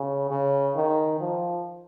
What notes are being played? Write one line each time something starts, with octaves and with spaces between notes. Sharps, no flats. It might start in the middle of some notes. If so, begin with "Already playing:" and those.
Already playing: C#3
C#3
D#3
F3